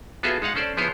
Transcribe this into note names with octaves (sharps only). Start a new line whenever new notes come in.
B3 F4 F#4 G#4 A4 E5
G#3 D#4 F5 F#5
C#4 A4 C5 D5
F3 B3 E4 G#4 C5 C#5